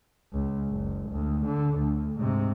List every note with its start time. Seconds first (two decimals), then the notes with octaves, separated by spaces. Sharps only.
0.33 C#2
0.69 F#1
1.10 D2
1.46 D3
1.78 D2
2.17 G#2 C3